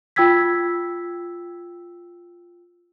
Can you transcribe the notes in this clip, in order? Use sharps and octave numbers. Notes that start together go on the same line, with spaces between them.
F4 G5 E6 G#6 B6